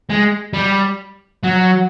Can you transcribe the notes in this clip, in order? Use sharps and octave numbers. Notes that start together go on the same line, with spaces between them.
G#3
G3
F#3